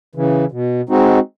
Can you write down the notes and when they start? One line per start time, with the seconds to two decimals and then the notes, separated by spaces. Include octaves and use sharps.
0.15 C#3 E3
0.52 B2
0.89 G#3 C4 D#4 F#4